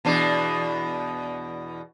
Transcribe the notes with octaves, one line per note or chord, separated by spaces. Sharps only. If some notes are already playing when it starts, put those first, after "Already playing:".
E2 B2 D4